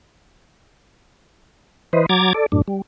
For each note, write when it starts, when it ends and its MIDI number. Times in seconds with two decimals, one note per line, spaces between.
1.93 2.06 52
1.93 2.06 71
1.93 2.06 72
1.93 2.06 75
2.09 2.33 54
2.09 2.33 82
2.09 2.33 86
2.09 2.33 92
2.09 2.33 93
2.34 2.46 69
2.34 2.46 74
2.52 2.62 42
2.52 2.62 45
2.52 2.62 62
2.68 2.82 55